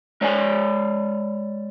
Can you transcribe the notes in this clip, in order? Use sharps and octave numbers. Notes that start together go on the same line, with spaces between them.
G#3 C#5 D5 G5 G#5